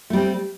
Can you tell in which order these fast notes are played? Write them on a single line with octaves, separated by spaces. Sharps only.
A3 G3 C4